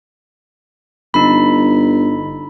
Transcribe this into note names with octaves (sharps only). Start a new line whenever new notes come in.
G1 D#4 B5